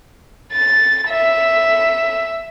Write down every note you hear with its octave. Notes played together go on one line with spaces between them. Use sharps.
A6
E5